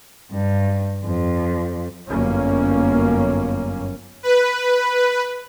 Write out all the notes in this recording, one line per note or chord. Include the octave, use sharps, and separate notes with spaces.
G2
F2
G1 F#2 A#3 C#4
B4